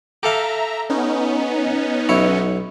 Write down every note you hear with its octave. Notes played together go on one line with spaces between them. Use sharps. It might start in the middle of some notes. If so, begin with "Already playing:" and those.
G4 A4 E5 F5 A#5
B3 C#4 D#4
B1 E4 C#5